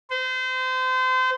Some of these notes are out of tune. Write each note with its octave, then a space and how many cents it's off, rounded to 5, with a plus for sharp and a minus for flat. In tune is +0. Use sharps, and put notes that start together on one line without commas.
C5 -30